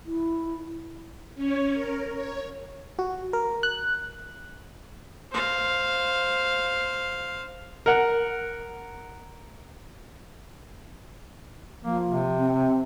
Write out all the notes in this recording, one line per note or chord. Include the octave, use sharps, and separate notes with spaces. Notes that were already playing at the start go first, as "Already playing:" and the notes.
E4
C#4 C#5
A#4
C#5
F#4
A#4
F#6
C5 F5
A#4 F#5
F3 A#3
C3
C4